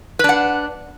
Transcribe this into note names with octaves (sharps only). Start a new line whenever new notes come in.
D4 B4 F#5